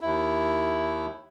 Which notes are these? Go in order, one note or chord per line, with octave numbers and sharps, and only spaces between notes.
D#2 E4